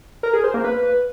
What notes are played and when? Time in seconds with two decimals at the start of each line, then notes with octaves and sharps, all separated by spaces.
0.23 A#4
0.34 G#4
0.44 C5
0.54 A#3
0.64 B4